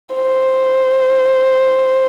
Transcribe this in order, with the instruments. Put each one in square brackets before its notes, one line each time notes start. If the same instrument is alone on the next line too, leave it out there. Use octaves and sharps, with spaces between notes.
[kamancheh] C5